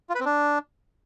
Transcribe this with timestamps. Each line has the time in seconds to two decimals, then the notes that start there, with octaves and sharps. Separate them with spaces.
0.09 F4
0.15 B4
0.20 C4
0.25 D4